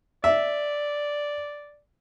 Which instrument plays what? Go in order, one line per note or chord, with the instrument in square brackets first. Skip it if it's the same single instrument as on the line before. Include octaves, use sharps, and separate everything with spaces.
[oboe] D5 [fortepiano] E5